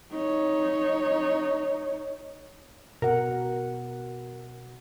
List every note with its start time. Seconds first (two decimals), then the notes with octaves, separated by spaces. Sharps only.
0.12 D#4 C#5
3.02 B2 A#4 F#5